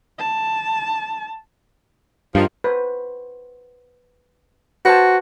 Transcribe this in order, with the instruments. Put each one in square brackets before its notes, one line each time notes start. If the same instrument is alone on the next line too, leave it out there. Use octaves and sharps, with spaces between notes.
[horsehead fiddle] A5
[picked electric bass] G2 [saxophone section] D#3 F3
[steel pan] B4 C5
[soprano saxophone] F#4 [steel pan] B4 C5 A5